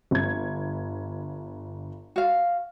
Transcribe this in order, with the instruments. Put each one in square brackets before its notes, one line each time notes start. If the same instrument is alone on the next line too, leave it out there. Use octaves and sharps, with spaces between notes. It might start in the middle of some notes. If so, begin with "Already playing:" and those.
[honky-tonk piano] G1 G#6
[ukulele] F#4 F5